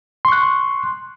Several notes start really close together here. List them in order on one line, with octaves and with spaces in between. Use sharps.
C6 C#6 F#6